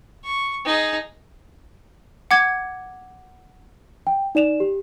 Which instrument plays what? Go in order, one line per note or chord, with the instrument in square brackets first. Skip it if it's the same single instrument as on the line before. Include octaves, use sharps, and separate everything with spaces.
[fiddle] C#6
D#4 G#4
[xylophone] F#5 D6 G#6
[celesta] G5
D#4 D5 E7 F7
G4